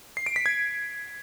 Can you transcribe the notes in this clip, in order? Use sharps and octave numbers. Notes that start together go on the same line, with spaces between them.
C7
D7
B6
G#6